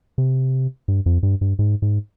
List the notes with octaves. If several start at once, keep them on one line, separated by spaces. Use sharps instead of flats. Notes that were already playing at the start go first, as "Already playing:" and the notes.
C3
G2
F2
G2
G2
G#2
G#2